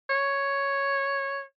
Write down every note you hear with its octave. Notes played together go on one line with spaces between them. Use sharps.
C#5